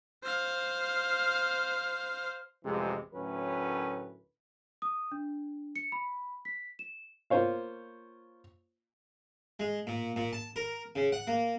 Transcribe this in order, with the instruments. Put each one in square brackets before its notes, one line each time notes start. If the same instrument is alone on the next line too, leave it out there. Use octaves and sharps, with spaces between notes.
[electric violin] C5 F5
[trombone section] A1 F2 C3 E3 G#3
D2 A2 F#3 C#4 A#4 B4
[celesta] D#6
D4
C#7
B5
B6
E7
[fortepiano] A#3 F4 C5 C#5 F5
[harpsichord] G#3
A#2
A#2
A5
A#4
C#3
F#5
A#3